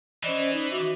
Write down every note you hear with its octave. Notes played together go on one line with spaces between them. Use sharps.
E3 C#4 C5 D5 D#5
D#4
F#4 E5 D6